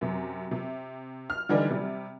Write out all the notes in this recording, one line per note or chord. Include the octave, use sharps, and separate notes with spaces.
F#2 C3
C3
F6
D3 E3 G3 D4 D#4
C3 G3